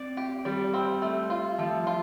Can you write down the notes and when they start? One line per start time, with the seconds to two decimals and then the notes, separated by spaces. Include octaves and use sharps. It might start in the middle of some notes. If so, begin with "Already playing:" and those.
Already playing: C4 D5
0.17 G4
0.45 G3 D5
0.74 C4
1.02 A3
1.30 F4
1.58 F3 A3
1.87 F4